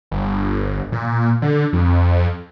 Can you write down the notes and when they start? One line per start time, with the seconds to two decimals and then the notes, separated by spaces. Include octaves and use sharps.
0.12 G1
0.92 A#2
1.42 D3
1.73 F2